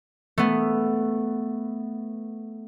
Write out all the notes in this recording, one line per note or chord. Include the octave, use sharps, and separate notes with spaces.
A3 B3